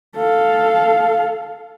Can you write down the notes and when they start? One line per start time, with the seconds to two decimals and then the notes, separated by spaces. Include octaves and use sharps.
0.17 A4 F5